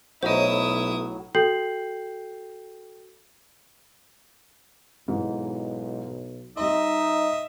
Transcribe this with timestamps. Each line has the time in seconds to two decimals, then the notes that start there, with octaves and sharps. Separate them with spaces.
0.23 B1 A2 F#3 E4 C5 D#5 D#6
1.35 F#4 A4 G5 G6 C7 F#7
5.08 B1 G#2 E3
6.57 G3 D#4 D#5 E5 C6